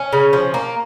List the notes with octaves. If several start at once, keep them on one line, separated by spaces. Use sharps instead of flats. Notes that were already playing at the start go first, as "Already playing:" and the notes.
Already playing: C#4
C#3
F3
A#3